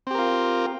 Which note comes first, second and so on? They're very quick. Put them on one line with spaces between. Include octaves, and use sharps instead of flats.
C4 G4 A#4 F4